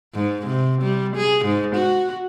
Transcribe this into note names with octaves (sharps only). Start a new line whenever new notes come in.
G#2
C3
G3
G#4
G#2
F#4